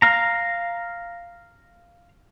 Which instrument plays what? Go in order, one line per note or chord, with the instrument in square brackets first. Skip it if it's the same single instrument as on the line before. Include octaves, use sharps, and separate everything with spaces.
[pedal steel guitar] F5 A#5